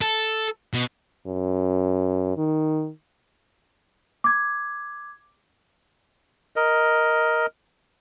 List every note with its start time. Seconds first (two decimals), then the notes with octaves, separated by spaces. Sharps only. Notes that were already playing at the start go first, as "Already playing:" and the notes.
0.02 A4
0.73 B2
1.27 F#2
2.37 D#3
4.24 D6 G#6
6.56 A#4 D#5